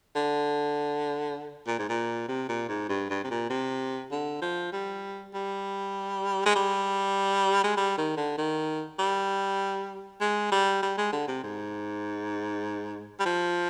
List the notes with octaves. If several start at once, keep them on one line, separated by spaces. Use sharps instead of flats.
D3
A#2
G#2
A#2
C3
A#2
G#2
G2
G2
C3
A#2
C3
D3
F3
G3
G3
G#3
G3
G#3
G3
D#3
D3
D#3
G3
G#3
G3
G3
G#3
D3
C3
G#2
G3
F3